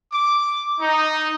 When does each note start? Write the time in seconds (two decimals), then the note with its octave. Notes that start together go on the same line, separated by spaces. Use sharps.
0.12 D6
0.80 D#4